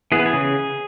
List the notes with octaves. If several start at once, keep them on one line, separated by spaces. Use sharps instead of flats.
E3 B3 G#4
B4
G#4
C#3